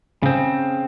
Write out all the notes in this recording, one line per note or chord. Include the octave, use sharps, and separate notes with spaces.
C#3 C4